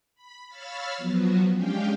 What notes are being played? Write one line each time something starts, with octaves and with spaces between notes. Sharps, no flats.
B5
C#5 F5 B5 E6 F6 A6
F3 F#3 B3 F#4
G#3 C#4 D4 G4 F5 G5